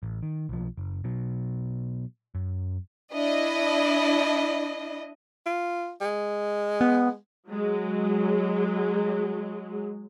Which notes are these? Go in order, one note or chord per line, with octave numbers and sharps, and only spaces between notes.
A1
D#3
B1 F3
F#1
B2 F#3
F#2
D4 E4 D#5
F4
G#3
B3
F#3 G#3